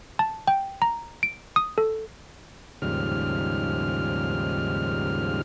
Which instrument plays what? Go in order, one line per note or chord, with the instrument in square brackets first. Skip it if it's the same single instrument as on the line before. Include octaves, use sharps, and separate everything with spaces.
[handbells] A5
G5
A#5
D7
D#6
A4
[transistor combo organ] D#2 G#2 C#3 F3 G3 F6